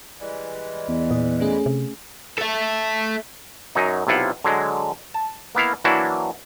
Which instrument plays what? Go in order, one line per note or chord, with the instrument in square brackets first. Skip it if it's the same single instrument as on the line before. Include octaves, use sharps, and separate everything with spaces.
[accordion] E3 G3 G#3
[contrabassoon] E2
[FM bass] A#2 [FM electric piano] D#5
[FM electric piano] A3 C#4 G#4
[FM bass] C3
[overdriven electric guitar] A4 E5
[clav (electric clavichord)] F#2 F#3 D#4
B1 C3 E4 F4 F#5
D3 F#3 G#3
A5
A#3 B3 E4 F5
E3 F#3 A#3 D4 E4 F#4